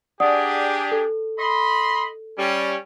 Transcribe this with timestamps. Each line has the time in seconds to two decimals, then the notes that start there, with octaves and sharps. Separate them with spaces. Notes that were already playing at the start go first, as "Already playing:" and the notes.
0.20 D4 G4 G#4 D5 F#5 D#6
0.92 A4
1.38 D#5 B5 C6
2.38 G3 C#4